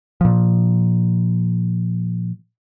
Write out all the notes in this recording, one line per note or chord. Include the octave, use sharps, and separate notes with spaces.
A#2 F3